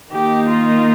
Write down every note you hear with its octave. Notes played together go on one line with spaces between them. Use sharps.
D#3 A#3 D#4 G4
F4